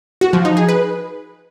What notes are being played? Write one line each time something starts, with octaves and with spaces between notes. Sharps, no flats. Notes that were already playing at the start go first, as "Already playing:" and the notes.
F#4
F3
D#4
G#4
B4